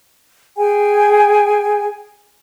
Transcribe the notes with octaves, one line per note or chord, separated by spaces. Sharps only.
G#4 G5 G#5